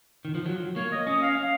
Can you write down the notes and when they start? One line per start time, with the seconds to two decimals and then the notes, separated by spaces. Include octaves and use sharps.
0.25 D#3
0.35 F3
0.46 F#3
0.76 A#3 C#5
0.92 D#5
1.07 C#4 D#5
1.22 F5
1.37 F5